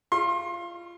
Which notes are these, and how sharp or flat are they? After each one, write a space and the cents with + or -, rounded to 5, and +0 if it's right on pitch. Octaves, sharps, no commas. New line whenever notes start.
F4 -20 C6 +30